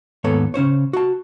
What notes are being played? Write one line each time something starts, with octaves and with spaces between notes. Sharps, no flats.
D#2 G#2 B3 A4 C#5
C#3 C#4 C5 C#5
F#4 A5